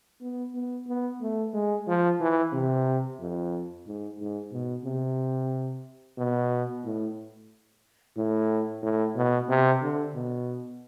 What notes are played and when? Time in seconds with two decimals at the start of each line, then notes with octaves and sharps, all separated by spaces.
0.21 B3
0.55 B3
0.88 B3
1.21 A3
1.54 G#3
1.87 F3
2.20 E3
2.53 C3
3.20 F2
3.87 G#2
4.19 G#2
4.52 B2
4.85 C3
6.18 B2
6.84 A2
8.17 A2
8.83 A2
9.16 B2
9.49 C3
9.82 D3
10.15 B2